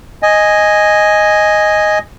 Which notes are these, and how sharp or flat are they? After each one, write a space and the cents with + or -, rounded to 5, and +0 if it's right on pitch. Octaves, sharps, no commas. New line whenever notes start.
D#5 +0 G#5 +0